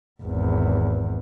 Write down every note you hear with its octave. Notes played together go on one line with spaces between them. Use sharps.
G#1 E2